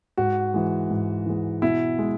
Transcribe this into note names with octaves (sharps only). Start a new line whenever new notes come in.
G#2 F#4
E3 G#3
G#2
E3 G#3
B2 E4
G#3